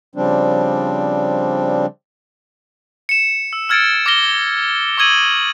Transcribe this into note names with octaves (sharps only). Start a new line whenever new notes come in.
C#3 F3 G3 C4 D4
C#7 E7
E6
E6 F6 G#6 A6 C#7 D7
D6 F6 A#6 G7
C#6 D#6 E6 G#6 D#7 F#7